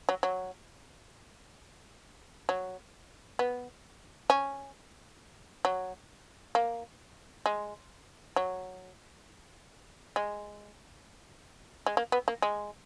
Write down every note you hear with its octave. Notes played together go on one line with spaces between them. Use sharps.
F#3
F#3
F#3
B3
C#4
F#3
A#3
G#3
F#3
G#3
G#3
A#3
B3
A#3
G#3